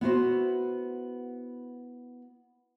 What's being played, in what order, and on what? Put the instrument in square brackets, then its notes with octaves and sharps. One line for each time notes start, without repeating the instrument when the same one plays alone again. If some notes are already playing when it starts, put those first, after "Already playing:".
[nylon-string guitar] B3 E4 F#4 C5